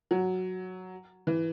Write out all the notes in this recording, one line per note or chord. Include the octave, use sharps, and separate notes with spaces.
F#3
E3